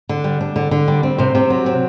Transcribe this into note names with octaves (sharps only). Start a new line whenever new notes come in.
D3
G3
D4
D3
D3
G3
C4
C3 C5
C3
F#3
C4